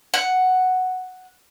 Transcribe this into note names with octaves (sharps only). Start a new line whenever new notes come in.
F#5